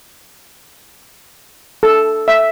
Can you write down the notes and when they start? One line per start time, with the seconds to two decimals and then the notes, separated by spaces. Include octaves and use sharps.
1.83 A4
2.28 E5